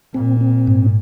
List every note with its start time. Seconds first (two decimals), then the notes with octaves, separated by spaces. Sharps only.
0.13 A#2 C4
0.41 C4
0.67 G#2